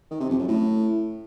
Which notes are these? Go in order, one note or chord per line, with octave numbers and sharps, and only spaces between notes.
D#3
C3
F2
F#2
A2